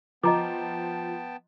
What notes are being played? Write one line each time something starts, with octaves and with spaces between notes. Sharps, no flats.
F3 B3 D#5 G5 A5 A#5 D6